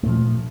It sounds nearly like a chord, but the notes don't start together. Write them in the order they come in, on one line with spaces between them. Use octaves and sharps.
A3 A#2 F3